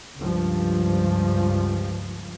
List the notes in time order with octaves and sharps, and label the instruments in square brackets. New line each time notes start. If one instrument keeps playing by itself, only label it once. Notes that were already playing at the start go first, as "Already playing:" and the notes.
[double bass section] C#2 G2 F3